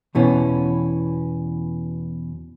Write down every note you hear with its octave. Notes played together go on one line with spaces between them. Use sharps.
E2 B2 E3 C#4